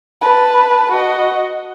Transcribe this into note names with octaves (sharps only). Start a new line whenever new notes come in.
B4 A5
F#4 D#5